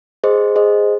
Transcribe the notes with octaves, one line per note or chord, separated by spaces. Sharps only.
G#4 C5 D#5
G#4 C5 D#5